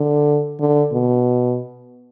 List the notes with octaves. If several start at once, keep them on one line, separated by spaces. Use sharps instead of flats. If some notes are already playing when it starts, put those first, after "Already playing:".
Already playing: D3
D3
B2